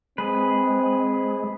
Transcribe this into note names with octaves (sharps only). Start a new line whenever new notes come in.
G#3 C4 G#4 B4